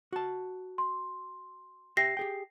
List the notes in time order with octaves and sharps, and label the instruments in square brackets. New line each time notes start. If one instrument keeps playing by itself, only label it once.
[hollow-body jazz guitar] F#4 A5
[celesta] C6
[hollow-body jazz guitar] G4 E5 G5 [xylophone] A#6 [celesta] C7
[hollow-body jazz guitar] G4 G#4 G5